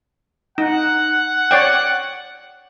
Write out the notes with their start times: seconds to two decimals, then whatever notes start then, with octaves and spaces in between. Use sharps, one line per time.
0.58 D#4 F#5
1.51 C#5 D5 G5